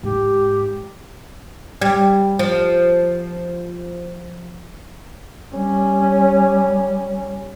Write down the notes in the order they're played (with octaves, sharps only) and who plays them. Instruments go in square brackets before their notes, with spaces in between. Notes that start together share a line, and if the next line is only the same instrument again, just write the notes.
[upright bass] G#2 [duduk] G4
[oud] G3
F3
[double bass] G3 C#4